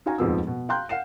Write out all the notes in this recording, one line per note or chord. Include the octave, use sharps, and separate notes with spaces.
D#4 F#4 F5 G#5 A#5
D#1 F2 G#2 F3 B3 E6
B2
F5 G5 A#5 C6 F#6 G6
F5 F#5 C7 E7